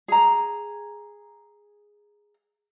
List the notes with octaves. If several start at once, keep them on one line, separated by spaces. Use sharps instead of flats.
G#4 A#5